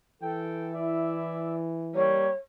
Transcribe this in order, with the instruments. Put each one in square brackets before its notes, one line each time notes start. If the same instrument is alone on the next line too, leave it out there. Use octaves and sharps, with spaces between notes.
[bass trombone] E3 [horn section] A4 G5
[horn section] E4 D5 E5
[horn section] G3 A#3 [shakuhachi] C#5